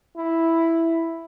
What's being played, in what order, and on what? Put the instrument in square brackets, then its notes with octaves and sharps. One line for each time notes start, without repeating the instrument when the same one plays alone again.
[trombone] E4